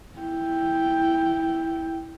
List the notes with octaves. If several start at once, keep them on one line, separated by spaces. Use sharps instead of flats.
E4 G5